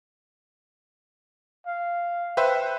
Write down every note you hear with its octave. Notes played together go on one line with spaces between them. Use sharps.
F5
B4 C5 E5 G5 F#6